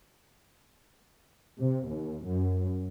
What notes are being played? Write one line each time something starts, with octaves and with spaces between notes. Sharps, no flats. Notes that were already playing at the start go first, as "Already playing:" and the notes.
C3
D#2
F#2